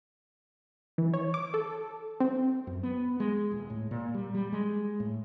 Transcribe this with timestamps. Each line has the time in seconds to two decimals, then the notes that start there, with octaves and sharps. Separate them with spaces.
0.98 E3
1.14 C#5
1.34 D6
1.54 A4
2.20 C4
2.67 F#2
2.83 B3
3.20 G#3
3.51 D#1
3.70 A2
3.91 A#2
4.14 G3
4.35 G3
4.53 G#3
5.00 A2